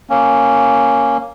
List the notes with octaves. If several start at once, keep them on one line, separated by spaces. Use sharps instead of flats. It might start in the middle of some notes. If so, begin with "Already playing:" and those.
A#3 C#4